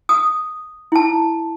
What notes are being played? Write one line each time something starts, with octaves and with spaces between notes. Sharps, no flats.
D#6
E4 A5